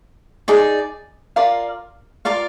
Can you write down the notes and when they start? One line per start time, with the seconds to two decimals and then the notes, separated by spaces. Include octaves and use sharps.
0.48 D#4 G#4 D5
1.36 F4 A#4 D5 F5
2.25 F4 A#4 D5 F5